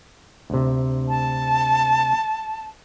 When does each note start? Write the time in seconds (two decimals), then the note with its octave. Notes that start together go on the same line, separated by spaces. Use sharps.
0.50 D2 C3
1.09 A5